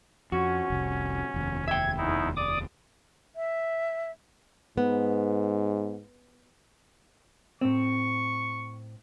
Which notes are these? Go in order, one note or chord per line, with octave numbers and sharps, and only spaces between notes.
F2 C#4 F#4
F1 C2
F1 D#2
E5 G5 G#6
E2 D#4 E4
D5 D6 D#6
E5
G#2 B3
A2 C4 C#6